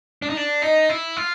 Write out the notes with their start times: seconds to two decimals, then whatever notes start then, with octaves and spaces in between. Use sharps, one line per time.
0.22 D4
0.30 D#4
0.37 D4
0.62 D#4 D#5
0.89 E4
1.17 F4